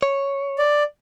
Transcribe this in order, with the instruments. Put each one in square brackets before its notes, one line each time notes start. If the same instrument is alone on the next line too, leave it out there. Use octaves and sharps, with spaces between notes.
[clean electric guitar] C#5
[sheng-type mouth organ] D5